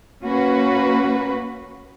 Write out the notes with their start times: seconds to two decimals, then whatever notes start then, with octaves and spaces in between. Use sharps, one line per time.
0.24 A#3 C#4 F#4 B4